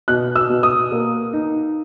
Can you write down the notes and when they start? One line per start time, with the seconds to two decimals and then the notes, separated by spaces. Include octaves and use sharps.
0.08 B2 F#6
0.36 E6
0.49 B2
0.63 D#6
0.92 A#3
1.33 D#4